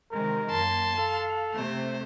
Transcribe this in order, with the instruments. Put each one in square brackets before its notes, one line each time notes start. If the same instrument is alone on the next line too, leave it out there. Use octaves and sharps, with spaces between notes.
[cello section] C3 D#3 G#3 [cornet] A#4
[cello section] F#2 A#3 [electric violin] A5 C6
[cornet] A4 [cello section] F5
[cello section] C3 A3 [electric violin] C5